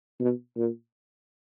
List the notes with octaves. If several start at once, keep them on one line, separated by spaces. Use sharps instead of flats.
B2
A#2